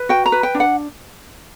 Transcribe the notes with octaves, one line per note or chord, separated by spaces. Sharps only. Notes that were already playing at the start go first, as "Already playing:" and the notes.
Already playing: B4
F#4 G5
A#5
B4
G5
D4
F#5